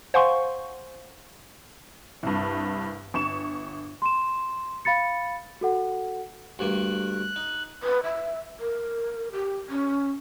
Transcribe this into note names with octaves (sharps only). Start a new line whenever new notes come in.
C5 F5 F#5 G#5 C6 C#6
C2 G2
G1 C#6 E7
C6 E7
F5 B5 A6 C#7
F#4 A4 F#5
D2 G2 A#3 F#6
D#4
B4
E5
A#4
G4
C#4